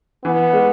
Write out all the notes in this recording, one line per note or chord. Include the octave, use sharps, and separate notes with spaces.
E3 B3
G#3